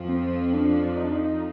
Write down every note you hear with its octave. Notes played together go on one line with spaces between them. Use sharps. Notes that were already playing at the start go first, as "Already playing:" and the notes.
Already playing: F2 F3
C4
D4
D#4
D4
D#4